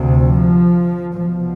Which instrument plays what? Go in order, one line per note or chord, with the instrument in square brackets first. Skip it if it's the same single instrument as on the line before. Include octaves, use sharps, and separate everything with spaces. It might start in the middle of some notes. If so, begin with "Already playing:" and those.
Already playing: [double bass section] D2 C3
F3
C2 B2 F3